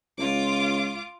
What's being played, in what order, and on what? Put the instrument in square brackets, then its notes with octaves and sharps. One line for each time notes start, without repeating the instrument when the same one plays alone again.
[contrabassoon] C#2 [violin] F4 D6